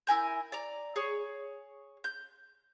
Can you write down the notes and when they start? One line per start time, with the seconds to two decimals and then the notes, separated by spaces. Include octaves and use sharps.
0.07 E4 A#4 G#5 G6
0.52 D5 A#5
0.96 G#4 C#5
2.04 G6